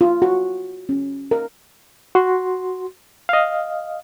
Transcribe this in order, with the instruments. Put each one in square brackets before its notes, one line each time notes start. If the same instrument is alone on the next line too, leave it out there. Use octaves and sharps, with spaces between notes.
[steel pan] F4
F#4
C#4
A#4
[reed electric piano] F#4 C6
D#5 F5